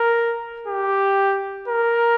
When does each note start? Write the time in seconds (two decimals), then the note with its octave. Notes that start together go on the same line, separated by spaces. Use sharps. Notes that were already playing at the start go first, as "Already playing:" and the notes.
Already playing: A#4
0.67 G4
1.68 A#4